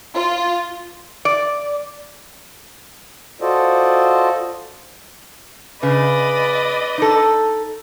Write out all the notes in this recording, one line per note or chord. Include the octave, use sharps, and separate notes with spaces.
F4
D5
F4 F#4 A4 C5 D5 D#5
C#3 B4 D5 D#5 B5
D#4 A4